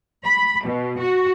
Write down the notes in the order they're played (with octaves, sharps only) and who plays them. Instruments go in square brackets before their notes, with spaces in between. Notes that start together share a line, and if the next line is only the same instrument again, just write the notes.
[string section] B5
B2
F#4